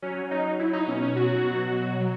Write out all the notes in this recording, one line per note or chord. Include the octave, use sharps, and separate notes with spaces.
F#3 C#4
F#3 D#4
F#3 E4
D#4
B2 C#4
C#4
F#3 F#4
B2
F#3
F#3